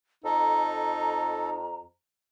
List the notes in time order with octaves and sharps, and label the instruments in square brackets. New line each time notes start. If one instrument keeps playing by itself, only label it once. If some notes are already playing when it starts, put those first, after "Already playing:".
[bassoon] F2 [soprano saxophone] D#4 [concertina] A4 [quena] A#5